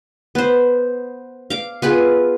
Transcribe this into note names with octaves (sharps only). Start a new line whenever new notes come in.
B3 C5
F5 D6
B3 F4 G#4 B4